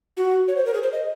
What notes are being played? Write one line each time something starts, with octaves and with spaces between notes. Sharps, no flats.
F#4
C#5
C5
A#4
G#4
C5
D#5